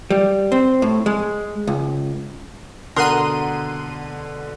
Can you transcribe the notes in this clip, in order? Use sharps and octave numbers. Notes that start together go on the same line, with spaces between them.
G3
C4
A2
G#3
C#2
B2 D3 A#4 F#5 C6 D#6 F#6 D#7